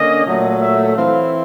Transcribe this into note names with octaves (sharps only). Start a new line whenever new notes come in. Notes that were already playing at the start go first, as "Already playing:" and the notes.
Already playing: D3 A#3 C#4 D#5
A#2 F#3 A3
E5
E3 A3 C4 E4 F5